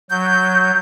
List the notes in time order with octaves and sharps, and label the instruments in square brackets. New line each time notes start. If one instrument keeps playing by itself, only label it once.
[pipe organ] F#3 [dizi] G6